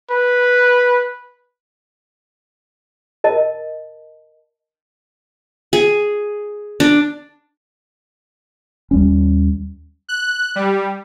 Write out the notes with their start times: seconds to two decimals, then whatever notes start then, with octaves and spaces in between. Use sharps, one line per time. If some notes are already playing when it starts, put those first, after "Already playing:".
0.10 B4
3.24 A#4 D#5 A5
5.73 G#4
6.80 D4
8.91 D#2 G3 C#4
10.09 F#6
10.56 G3